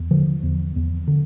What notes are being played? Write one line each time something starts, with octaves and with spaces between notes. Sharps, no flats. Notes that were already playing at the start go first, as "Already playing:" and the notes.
Already playing: E2
D3 F3
E2
E2
D3